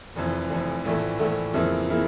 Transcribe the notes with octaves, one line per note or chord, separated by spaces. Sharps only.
F1 F2 E3
F1 F2 E3
A#1 A2 E3 A3
A#1 A2 E3 A3
F2 C#3 E3 A#3 E4
C#3 E3 A#3 E4